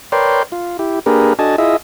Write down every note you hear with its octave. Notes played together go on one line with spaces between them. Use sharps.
A#4 B4 C#5 D5 G5 C6
F4
E4 G4
A#3 D4 G4 G#4 A#4 B4
D4 F#4 A4 D#5 G#5 A5
E4 F4 G#4 D#5 E5